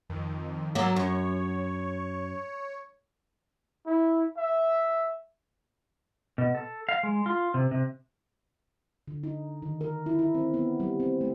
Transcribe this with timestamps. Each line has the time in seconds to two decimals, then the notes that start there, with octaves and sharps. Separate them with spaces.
0.09 F2 D#3
0.75 G#2 F#3 A#3 E6 A6
0.96 F#2 C#5
3.86 E4
4.37 E5
6.38 B2
6.55 A4
6.89 F5
7.03 G#3
7.26 F4
7.54 C3
7.71 C3
9.08 D3
9.23 D#4
9.62 D#3
9.81 A#4
10.06 E4
10.19 E4
10.35 C4
10.54 B3
10.80 G3
11.00 C4
11.21 A3